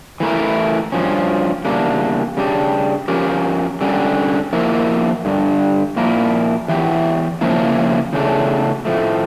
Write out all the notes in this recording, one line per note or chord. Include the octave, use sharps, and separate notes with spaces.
E3 A3 E4 A#4
G2 F3 C#4
E2 C#3 G3 A#3 D4
C#3 G3 D4 G4
F3 C#4 G4 A#4
D3 G3 C#4
F3 A#3 E4 A#4
G2 D3 G3
A#2 F3 A#3 E4 A#4
E2 E3 G4
C#3 F3 A#3 E4
E2 C#3 A3 D4
A2 F3 A3